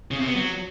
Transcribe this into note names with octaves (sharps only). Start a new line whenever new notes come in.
C#3
C3
B3
F#3